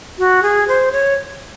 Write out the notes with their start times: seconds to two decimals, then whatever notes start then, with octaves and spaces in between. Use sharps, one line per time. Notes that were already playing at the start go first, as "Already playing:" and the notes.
0.18 F#4
0.42 G#4
0.68 C5
0.92 C#5